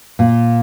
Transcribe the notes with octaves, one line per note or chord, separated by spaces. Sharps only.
A#2